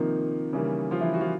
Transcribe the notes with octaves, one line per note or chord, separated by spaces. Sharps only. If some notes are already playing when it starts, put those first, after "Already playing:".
Already playing: C3 D#3 F3 A#3 D#4
C#3 E3 G3 A#3
F3 F4
E3 E4
F#4
F3 F4